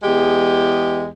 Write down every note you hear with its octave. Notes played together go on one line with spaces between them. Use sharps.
E2 G#3 G4